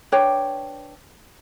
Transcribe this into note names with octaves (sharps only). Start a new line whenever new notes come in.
D4 B4 C#5 G5